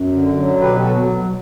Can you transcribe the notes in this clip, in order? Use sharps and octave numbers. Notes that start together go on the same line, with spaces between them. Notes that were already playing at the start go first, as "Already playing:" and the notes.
Already playing: F#2
D3
F#3
B2 G4 B4
F#4 A4
F#3